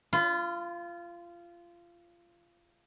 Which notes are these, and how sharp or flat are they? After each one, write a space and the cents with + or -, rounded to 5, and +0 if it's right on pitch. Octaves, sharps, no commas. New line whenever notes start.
F4 -20 B5 +45